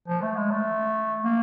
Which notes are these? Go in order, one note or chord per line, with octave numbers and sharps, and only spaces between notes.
F3
A3
G#3
A3
A#3